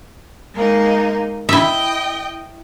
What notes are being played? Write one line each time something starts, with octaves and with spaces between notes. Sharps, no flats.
G#3 A#3 D#4
E4 D#5 E5 G5